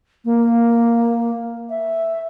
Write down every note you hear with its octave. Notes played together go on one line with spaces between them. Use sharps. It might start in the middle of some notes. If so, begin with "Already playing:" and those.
A#3
E5